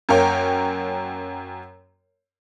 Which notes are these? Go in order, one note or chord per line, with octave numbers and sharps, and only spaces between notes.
F#2 A#3 A#4 C#5 G5